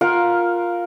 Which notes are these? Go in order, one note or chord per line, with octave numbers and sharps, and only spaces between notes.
F4 A#4 F5 F#5